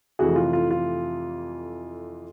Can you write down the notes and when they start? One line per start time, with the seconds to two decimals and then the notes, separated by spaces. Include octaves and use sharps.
0.19 F2 C3 E3 A3 F#4 G#4
0.36 F4
0.53 F4
0.71 F4